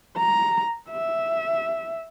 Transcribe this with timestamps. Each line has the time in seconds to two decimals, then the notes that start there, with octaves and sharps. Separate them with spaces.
0.17 A#5
0.89 E5